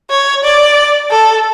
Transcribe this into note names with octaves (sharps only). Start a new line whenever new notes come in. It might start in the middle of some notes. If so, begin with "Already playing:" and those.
C#5
D5
A4